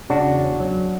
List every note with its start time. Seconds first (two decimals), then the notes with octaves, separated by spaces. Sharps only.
0.10 C#3 D4 F#4
0.27 E2
0.43 C#4
0.60 F#3